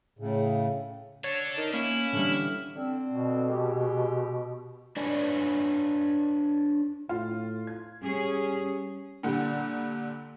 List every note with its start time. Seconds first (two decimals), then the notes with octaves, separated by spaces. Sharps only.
0.19 A2 C#3
1.24 D4 A4 C#5 A6
1.58 D#4 A#4
1.73 A#3 C#4 E4
2.13 D3 E3 G3 F6
2.76 D3 C4
3.10 B2
3.50 G#3 G4
4.97 D4 B4 C#5 D5 G#5
7.09 A2 F4
7.67 G#6
8.03 G3 C#4 G#4
9.23 A#2 D3 G3